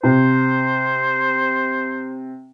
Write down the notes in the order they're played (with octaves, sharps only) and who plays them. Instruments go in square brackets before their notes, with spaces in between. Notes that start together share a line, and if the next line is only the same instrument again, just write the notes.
[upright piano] C3 [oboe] C5